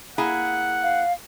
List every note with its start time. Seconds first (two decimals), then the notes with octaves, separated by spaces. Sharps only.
0.18 A#3 E4 G#4 F#5
0.83 F5